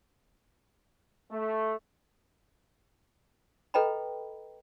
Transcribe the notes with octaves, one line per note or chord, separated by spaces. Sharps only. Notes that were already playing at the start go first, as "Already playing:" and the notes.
A3
A4 B4 D#5 G5 A#5 B5